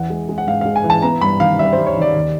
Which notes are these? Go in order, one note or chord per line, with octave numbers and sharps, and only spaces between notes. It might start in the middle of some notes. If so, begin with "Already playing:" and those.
Already playing: E2 E3 F#5
G#3
G#3
F#5
G#2 F5
G#3 F5
G#5
E3
A5
B3 A#5
G2 B5
D#3 F5
G3 E5
G3 C5
C#5
D#3 D5
D#2